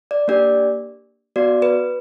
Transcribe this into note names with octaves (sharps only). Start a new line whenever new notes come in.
D5
A#3 D4 G4 D5
B3 F#4 D5
B4